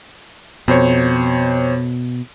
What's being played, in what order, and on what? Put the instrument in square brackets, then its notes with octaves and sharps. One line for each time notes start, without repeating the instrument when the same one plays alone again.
[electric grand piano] F2 C5 C#5 [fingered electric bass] B2